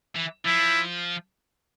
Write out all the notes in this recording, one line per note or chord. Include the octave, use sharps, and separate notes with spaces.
E3
F3 E4